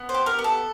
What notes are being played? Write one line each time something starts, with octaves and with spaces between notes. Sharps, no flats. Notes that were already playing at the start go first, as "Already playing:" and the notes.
Already playing: B3
C5
G4
A#4
B3
A4